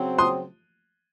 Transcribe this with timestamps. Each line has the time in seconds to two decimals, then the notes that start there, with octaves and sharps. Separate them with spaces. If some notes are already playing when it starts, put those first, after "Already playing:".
Already playing: C#3 F#3 C4
0.18 C6 D#6